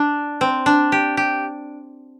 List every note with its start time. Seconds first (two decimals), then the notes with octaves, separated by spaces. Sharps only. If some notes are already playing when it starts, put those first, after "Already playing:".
Already playing: D4
0.41 C4
0.66 D4
0.92 G4
1.17 G4